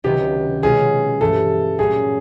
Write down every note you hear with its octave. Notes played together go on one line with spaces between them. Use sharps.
C#2 C3 D#3 F#3 B3 G4
B2 G#3 C#4 F4 G#4
G2 E3 A3 A4
A#2 F#3 A3 C#4 G#4